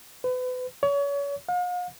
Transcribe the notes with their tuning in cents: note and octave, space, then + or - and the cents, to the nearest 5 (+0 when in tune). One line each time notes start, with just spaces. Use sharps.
B4 +35
C#5 +35
F5 +45